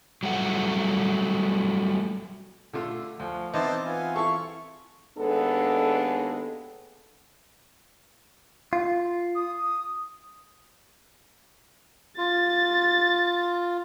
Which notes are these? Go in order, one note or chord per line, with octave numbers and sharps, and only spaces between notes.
F#3 G3 A3 F#5
D3 A3 F4
D2 F3
E3 B3 C4 D#4 C5 A5 D6
B3 F4 G#5
E4 A4 F5 C#6
D#2 G#3 B3 D4 A4
F4
D#6
F4 A6